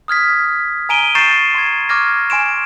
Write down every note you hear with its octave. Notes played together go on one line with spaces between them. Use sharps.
D#6 F6 G#6 B6
G#5 A#5 D7 D#7 G7
A#5 C#6 G6 A6 C7 E7
C6 G#6
C#6 D6 F6 G#6 A#6
G#5 C6 D7 E7